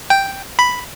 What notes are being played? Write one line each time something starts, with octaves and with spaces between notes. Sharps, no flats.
G5
B5